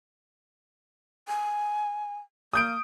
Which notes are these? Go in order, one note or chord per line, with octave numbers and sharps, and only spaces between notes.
G#5
A#3 D#6 G6 D7